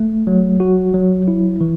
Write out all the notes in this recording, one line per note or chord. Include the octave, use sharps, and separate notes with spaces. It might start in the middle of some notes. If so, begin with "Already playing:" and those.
Already playing: A3
F#3
F#4
F#3
E4
E3